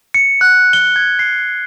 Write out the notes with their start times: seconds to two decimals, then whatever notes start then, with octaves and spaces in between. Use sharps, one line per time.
0.14 C#7
0.41 F#6
0.73 G7
0.96 G#6
1.19 C7